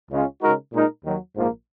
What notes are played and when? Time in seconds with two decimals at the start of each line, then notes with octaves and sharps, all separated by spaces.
0.11 C#2 C#3 G#3 C#4 F4
0.41 C#3 G#3 D#4 F#4 A#4
0.72 A#2 G#3 D#4 A#4
1.04 D#2 D#3 F#3
1.35 A#1 G#2 F3 A#3